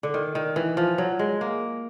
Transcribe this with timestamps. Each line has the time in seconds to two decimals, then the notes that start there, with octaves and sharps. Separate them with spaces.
0.03 D3
0.14 D#3
0.35 D#3
0.56 E3
0.77 F3
0.98 F#3
1.19 G#3
1.41 A#3